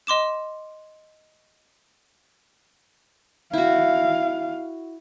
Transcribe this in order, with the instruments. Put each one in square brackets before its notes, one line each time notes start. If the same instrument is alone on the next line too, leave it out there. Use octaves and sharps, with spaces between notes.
[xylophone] D#5 C6 D6 E7
[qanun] E4 F#4 [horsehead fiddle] F5